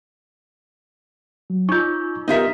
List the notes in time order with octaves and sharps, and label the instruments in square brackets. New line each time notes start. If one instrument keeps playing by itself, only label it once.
[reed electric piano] F#3
[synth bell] D#4 F4 [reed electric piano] C#6 G6
[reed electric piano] B3 G4 A#4 [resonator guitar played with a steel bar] D#4 F4 E5